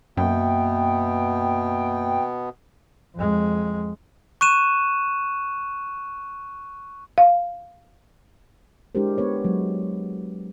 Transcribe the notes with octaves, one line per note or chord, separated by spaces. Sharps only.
F#2 B2 A#3 B3 E5 G5
F2 G#3
C#6 F#6 D#7 E7
F5
G#3 D4 E4 G4 A#4 C5
B3 B4 C#5
F#3 G#3